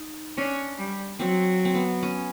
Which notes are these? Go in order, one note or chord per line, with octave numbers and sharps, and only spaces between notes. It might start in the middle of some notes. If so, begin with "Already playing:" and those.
Already playing: D#4
C#4 D4
G3
F#3 C4
C4
B3
C#4